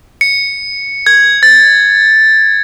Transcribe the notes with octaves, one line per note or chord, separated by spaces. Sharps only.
C#7
G#6
A6